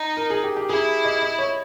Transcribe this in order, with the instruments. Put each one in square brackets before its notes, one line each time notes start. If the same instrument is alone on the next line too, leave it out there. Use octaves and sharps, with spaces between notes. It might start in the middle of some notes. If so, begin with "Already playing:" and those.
Already playing: [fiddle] D#4
[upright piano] A#4
G#4
G4
G4
[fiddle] E4 [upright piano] G#4
[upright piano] D#5
D#5
C#5